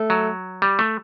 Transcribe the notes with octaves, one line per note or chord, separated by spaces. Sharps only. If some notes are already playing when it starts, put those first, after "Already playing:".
Already playing: A3
F#3
G3
A3